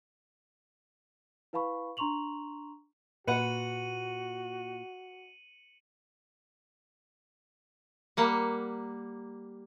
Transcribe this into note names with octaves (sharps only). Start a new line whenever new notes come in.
E4 B4 F5 A5 B5 C#6
D4 A#5 C6 C#6 F7 F#7
A#2 F#4 B4 F#5 C#7 D#7 F#7
G3 A#3 F#5